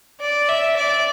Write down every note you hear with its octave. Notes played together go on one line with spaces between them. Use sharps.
D5
E5
D5